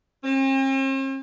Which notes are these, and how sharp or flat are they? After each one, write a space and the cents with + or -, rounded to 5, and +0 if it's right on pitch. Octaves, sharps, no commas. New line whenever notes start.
C4 +45